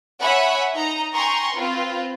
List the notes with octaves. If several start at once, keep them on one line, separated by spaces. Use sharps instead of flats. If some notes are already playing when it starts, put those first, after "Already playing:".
C#5 E5 F#5 G#5 B5
D#4 D#5 A#5
G5 G#5 A#5 C6 C#6
C4 F4 B4